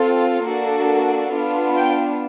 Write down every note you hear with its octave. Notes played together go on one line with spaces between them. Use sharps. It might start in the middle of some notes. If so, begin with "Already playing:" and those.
Already playing: C4 F4 A4
A#3 D4 F#4 A4
B3 D4 F4
G5